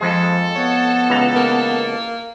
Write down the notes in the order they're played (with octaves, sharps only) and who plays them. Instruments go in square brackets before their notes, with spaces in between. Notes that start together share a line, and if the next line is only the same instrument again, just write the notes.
[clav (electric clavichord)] F2 G#3 [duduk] F3 [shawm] A4
[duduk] B3 [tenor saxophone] C#5
[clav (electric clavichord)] C#2 E3 A#5
[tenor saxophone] A#3